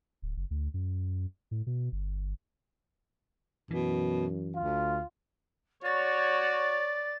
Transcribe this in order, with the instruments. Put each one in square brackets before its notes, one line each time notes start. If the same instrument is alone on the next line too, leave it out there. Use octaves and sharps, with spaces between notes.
[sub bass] D1
F#1
D2
F#2
A2
B2
G1
[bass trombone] F#2 [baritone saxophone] B2 [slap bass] E3
[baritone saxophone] D2 [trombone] F4
[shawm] F#4 [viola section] C#5 [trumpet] D5 [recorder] A6